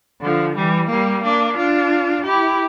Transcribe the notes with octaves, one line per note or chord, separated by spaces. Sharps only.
D3 F3
E3 G3
G3 A#3
A#3 D4
D4 F4
E4 G4